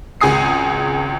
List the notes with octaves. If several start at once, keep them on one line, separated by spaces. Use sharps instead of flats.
G#1 C#2 G#4 G#5 D#6 C7